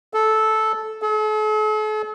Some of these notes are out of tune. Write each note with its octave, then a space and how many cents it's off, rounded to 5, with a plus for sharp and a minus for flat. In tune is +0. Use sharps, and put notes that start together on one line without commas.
A4 -10
A4 -45